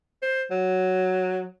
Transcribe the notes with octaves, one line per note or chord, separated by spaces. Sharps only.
C5
F#3